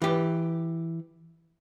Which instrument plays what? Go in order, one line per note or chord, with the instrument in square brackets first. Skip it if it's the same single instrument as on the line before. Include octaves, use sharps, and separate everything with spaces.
[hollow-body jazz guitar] E3 G4